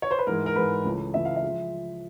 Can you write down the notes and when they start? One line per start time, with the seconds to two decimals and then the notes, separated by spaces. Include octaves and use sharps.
0.02 C#5
0.11 C5
0.19 B4
0.27 G#2 E3 G#3 A#4
0.46 A#4
0.56 G#2 E3 G#3 B4
0.85 C#2 C#3 E3 A3
1.14 C#2 C#3 E3 A3 E5
1.25 F5
1.36 E5
1.43 A2 F3 G#3